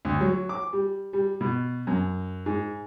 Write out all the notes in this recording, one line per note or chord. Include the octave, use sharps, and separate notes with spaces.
D2
F#3
D6
G3
G3
B2
F#2
G#2